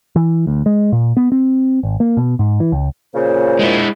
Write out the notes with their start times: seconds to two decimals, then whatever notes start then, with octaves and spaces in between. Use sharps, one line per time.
0.16 E3
0.47 D2
0.66 G#3
0.92 A#2
1.17 B3
1.32 C4
1.83 G#1
2.00 A#3
2.17 B2
2.39 G#2
2.60 E3
2.72 C#2
3.15 A#2 C#3 C5
3.59 G#3 E4